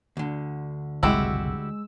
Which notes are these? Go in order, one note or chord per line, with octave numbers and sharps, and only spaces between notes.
D2 D3
F#1 C2 A2 G#3 E4 F#4 G4 E6